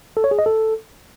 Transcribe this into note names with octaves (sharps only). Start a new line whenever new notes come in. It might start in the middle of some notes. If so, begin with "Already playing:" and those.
A4
C#5
G#4
D#5
A4